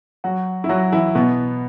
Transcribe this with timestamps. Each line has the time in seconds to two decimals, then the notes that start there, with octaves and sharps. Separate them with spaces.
0.24 F#3 F#4
0.64 E4
0.69 F#3 F#4
0.92 E3 E4
1.15 B2 B3